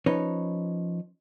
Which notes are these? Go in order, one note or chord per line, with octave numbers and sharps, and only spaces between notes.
F3 C#4 D#4 B4 C#5